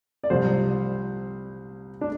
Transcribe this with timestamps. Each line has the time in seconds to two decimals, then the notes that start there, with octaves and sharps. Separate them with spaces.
0.24 D5
0.30 C2 C3 F3 C5
2.01 D4